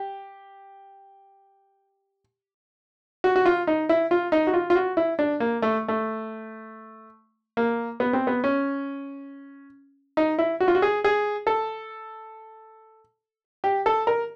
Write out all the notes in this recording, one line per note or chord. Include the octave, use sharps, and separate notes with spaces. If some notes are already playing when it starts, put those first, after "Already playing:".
Already playing: G4
F#4
F#4
F4
D#4
E4
F4
D#4
F#4
F4
F4
F#4
E4
D4
A#3
A3
A3
A#3
B3
C4
B3
C#4
D#4
E4
F#4
F4
F#4
G#4
G#4
A4
G4
A4
A#4